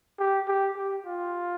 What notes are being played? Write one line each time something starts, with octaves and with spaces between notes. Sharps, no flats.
G4
G4
G4
F4